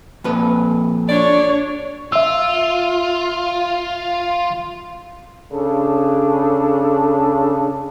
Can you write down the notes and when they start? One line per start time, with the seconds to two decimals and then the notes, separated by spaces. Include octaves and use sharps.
0.24 F2 A#2 B4
1.08 D4 C#5 D5
2.12 F4 E5 E6
5.52 C#3 D4 A4